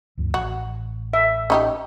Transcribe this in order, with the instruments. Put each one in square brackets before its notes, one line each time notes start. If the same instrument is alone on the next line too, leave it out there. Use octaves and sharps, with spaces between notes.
[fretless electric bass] D2 G2 F3
[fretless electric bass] A1 [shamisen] F#4
[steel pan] E5
[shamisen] C#4 D#4 G4